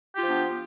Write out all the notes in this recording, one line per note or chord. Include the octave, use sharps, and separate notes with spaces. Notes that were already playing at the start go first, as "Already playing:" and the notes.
F3 B3 D4 F4 G4